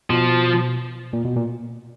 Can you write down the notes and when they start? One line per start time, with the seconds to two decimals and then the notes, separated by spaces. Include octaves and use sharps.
0.10 B2 F3
1.13 A#2
1.25 B2
1.36 A#2